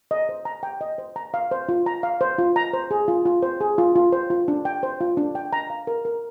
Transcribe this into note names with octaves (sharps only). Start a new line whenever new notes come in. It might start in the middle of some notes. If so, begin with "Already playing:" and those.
D#5
C5
A#5
G5
D#5
C5
A#5
F5
C5
F4
A#5
F5
C5
F4
A#5
C5
G#4
F4
F4
C5
G#4
F4
F4
C5
F4
D4
G5
C5
F4
D4
G5
A#5
F5
A#4
A#4